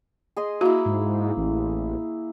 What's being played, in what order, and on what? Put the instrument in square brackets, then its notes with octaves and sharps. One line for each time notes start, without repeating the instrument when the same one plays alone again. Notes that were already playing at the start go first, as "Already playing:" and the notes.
[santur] G#4 D#5 C6
[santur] A#3 E4 [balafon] F#4
[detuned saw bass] G#2
A1